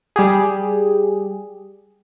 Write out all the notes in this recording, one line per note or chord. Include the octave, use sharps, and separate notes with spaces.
G3 G4 G#4